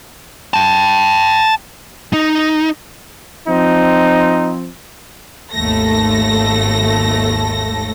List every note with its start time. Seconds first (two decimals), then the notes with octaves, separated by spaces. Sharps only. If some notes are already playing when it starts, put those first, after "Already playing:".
0.54 G5 A5
2.13 D#4
3.48 F3 C4 D#4
5.53 G#1 D#2 A3 A4 A#6